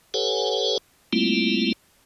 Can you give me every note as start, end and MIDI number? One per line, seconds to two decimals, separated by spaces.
0.14 0.78 67
0.14 0.78 69
0.14 0.78 71
0.14 0.78 73
0.14 0.78 78
0.14 0.78 80
1.13 1.73 55
1.13 1.73 57
1.13 1.73 58
1.13 1.73 60
1.13 1.73 64
1.13 1.73 65